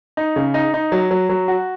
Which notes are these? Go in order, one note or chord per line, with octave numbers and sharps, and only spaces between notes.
D#4
C#3
D#4
D#4
F#3
F#3
F#3
F#4